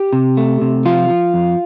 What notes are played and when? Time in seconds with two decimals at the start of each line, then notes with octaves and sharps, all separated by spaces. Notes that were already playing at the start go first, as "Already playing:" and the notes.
Already playing: G4
0.13 C3
0.37 A3
0.62 C3
0.85 F3 F4
1.10 F3
1.34 F2